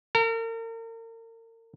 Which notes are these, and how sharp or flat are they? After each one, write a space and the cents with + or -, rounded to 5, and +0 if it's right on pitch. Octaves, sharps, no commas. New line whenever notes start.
A#4 -40